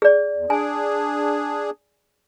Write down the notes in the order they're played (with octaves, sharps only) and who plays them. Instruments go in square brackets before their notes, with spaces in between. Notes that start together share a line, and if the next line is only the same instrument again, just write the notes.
[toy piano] G#4 D5
[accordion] E2
[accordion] D4 G#4 [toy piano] G#5